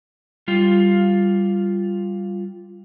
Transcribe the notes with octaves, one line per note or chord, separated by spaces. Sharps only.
G3 F4